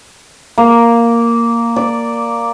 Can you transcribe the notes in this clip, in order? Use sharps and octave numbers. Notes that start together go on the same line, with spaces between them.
A#3
D5